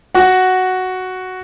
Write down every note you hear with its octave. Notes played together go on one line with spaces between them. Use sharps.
F#4 F#5